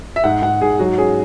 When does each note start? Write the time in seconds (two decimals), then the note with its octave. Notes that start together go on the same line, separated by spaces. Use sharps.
0.16 E5
0.24 G#2 F#5
0.42 G#2 F#5
0.61 G#2 G#4
0.79 F#3 F#4
0.98 C#4 G#4